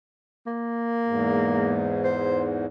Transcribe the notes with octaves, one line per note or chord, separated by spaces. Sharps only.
A#3
E2 G#2
C5